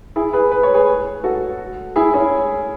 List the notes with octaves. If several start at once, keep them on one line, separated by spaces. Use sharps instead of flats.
E4 G#4
G#4 B4
B4
C#5
G#4 B4
F#4 A4
E4 G#4
C#4 E4